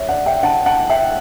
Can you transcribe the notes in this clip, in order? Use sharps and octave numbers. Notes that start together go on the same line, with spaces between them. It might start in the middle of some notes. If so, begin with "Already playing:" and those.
Already playing: C#5 E5
D5 F#5
E5 G5
F#5 A5
F#5 A5
E5 G5